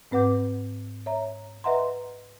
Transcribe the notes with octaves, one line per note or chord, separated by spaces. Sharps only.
G#2 C4 B4 F#5 D6 G6
C#5 E5 A#5
B4 D#5 E5 F#5 A#5 C6